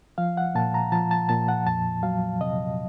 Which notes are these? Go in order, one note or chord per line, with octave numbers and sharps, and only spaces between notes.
F3 F5
F#5
A#2 A5
A#5
F3 A5
A5
A#2 A5
F#5
F2 A5
F#3 F5
C3 D#5